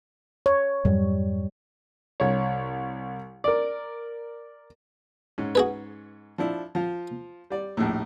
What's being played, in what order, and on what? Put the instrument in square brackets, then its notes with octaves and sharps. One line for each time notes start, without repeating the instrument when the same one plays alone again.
[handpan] C#5
[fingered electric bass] F2 G#2 F#3 [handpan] G3
[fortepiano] C2 C#5
A#4 D5
G#2 C#4
[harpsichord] F#4 G#4 B4
[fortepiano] F3 D4 E4
F3 F4
G3 D5
A#1 D#2 A2